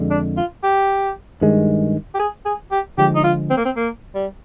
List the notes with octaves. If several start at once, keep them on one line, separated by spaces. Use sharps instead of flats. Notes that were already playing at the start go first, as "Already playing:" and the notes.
Already playing: F2 D3 G#3
D4
F4
G4
G2 D#3 G#3
G4
G#4
G#4
G4
D3 F3 G#3 G4
D#4
F4
C4
A#3
C4
A#3
G3